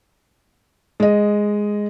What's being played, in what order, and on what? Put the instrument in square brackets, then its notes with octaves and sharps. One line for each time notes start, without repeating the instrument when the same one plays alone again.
[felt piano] G#3 D#5